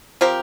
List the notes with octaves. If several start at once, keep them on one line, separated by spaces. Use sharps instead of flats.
F3 C4 G4 A#4